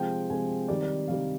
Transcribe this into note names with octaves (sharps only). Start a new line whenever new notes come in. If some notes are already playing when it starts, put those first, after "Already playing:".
Already playing: C3 F3 G#3 G5
C3 F3 G#3 G#5
C3 D#3 G3 D5
D5
C3 D#3 G3 F5